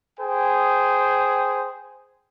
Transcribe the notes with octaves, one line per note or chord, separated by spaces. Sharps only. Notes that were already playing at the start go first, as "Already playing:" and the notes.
G#4 C5 G5